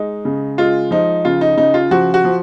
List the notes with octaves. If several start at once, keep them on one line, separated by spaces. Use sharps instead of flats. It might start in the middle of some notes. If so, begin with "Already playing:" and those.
Already playing: G#3 D#4
C#3
G#3 F4
F3 D#4
C#3 F4
D#4
C#3 D#4
F4
F3 F#4
F#4
F3